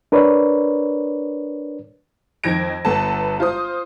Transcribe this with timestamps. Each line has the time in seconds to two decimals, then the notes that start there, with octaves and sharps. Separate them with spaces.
0.12 D4 A#4 B4 C#5 D5
2.44 F2 D#3 G#6 A#6 D7
2.85 G1 B3 A4 A5
3.40 F4 C5 D#6